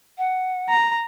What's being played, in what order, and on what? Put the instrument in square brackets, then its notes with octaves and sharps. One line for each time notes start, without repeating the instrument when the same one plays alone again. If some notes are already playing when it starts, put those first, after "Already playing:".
[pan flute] F#5
[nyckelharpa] A#5